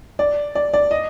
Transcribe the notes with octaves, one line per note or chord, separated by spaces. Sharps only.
D5
D5
D5
D#5